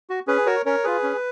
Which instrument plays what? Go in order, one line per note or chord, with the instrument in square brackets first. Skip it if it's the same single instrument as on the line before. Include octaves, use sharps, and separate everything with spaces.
[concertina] F#4
C#4 G#4 B4
F#4 A#4 C#5
C#4 A#4 C#5
F4 G#4 B4
C#4